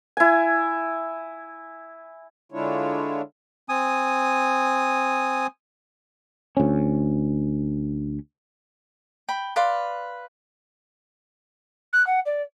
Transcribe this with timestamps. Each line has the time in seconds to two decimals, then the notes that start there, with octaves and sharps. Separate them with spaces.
0.17 E4 G#5
2.52 D3 G#3 D4 E4 F4 C#5
3.69 C4 G#5 D#6
6.57 D2 C#4
9.29 G5 B5
9.56 B4 D5 F5 C6
11.93 F#6
12.07 F#5
12.26 D5